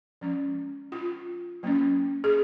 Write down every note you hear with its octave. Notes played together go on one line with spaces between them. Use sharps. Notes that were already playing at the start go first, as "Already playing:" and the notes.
F3 G#3 C#4
F4
F#3 A#3 C#4
G#4